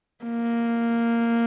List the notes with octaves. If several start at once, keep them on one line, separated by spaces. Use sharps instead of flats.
A#3